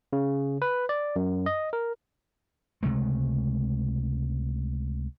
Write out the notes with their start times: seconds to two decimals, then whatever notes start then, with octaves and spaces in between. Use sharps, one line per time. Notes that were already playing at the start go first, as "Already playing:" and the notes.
0.13 C#3
0.62 B4
0.89 D5
1.16 F#2
1.46 D#5
1.73 A#4
2.83 C#2 C3 G#3 A3